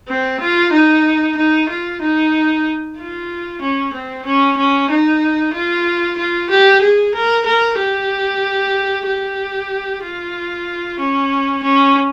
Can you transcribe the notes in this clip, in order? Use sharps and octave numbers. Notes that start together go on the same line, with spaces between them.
C4
F4
D#4
D#4
F4
D#4
F4
C#4
C4
C#4
C#4
D#4
F4
F4
G4
G#4
A#4
A#4
G4
G4
F4
C#4
C#4